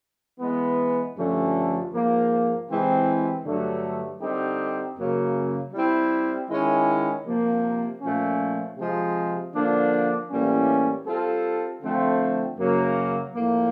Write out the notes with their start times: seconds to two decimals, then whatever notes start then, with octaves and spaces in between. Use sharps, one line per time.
0.40 E3 G#3 B3
1.16 G2 D3 F3 A3 C#4
1.93 G#2 F3 A#3
2.68 C3 E3 G#3 C4 E4
3.44 G2 D3 F#3 A3 D4
4.21 D3 G3 C4 D#4 G4
4.96 F#2 C#3 F#3 A#3
5.73 G3 C4 E4
6.49 D#3 G#3 C#4 E4
7.25 C3 F3 A#3
8.01 A#2 F3 A3 C#4
8.77 C3 F3 G#3
9.54 D3 F3 A#3 D4
10.30 A2 E3 G3 A#3 C#4
11.06 G3 C4 F4 A4
11.82 D3 F3 A3 C4
12.58 F#2 C#3 F#3 A#3
13.35 A2 F3 A#3